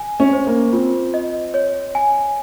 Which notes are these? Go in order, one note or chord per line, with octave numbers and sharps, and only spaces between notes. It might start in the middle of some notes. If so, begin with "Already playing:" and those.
Already playing: G#5
C#4
C5
A#3
C4 F4
D#5
C#5
G#5